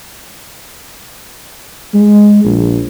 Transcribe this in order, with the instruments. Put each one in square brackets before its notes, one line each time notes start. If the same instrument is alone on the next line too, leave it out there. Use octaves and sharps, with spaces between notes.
[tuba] G#3
A#1